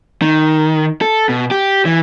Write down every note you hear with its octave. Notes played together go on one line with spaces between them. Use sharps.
D#3
A4
B2
G4
E3